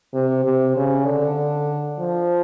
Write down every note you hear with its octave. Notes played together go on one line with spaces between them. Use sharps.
C3
C3
C#3
D3
F3